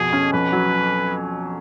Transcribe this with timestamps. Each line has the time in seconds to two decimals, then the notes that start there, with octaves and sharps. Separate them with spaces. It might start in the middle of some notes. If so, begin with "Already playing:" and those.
Already playing: F2 B2 G#4
0.13 C#4
0.33 F2 B4
0.52 F#3